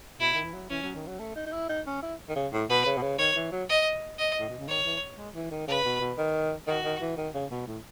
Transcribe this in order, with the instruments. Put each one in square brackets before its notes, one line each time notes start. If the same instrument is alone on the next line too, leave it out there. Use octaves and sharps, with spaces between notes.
[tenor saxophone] B2 [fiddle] E4
[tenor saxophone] D#3
E3
F#3
[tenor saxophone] E3 [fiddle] C#4
[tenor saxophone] F#3
D#3
F#3
A3
D#4
D#4
E4
D#4
C#4
E4
D#3
C#3
A2
[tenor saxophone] B2 [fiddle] B4
[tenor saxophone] C#3
B2
C#3
[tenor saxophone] D#3 [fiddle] C#5
[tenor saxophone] E3
F#3
[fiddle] D#5
D#5
[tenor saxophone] A2
B2
C#3
[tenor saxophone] D#3 [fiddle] C#5
[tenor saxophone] E3
G#3
E3
D#3
[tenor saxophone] C#3 [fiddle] B4
[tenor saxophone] B2
B2
D#3
[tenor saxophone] D#3 [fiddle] F#4
[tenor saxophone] D#3
E3
D#3
C#3
B2
A2